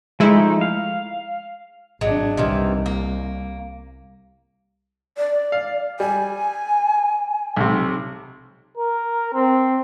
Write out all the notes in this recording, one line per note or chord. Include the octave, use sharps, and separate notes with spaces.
F3 G#3 A3 D#4 E4
F5
G#1 F#3 G#3 D4
C2 C3 D#3 E3
A#3
D5
F5
G3 G#5
B1 C3
A#4
C4